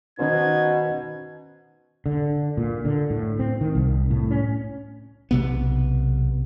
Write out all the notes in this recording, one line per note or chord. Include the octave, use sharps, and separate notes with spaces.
B2 D#3 C#4 D#4 C5 G#6
D3
A#2
D3
A2
C4
D#3
C2
A2
C#4
B1 C3 B3